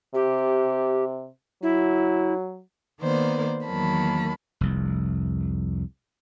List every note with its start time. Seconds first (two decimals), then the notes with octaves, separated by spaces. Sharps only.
0.15 C3 G4
1.63 F#3 E4
3.00 D#3 A#3 B3 C5 D5
3.66 E2 D#3 F#3 A#3 A5 B5
4.61 F1 C2